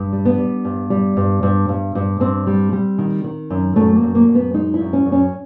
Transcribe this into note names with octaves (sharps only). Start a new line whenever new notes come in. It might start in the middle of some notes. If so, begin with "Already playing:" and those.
Already playing: G2
G3
B3
G3
G2
G3
G2
G2
G2
G2
G2 C4
G3
G3
D#3
D#3
F#2
F#2 A3
A#3
F#2
A#3
F#2
B3
G#3 D#4
E4
F#2
C#4
F#2
C#4